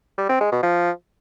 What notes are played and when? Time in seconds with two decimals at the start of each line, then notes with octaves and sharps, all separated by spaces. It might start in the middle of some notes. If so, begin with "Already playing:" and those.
0.18 G3
0.29 C4
0.40 G#3
0.52 B2
0.63 F3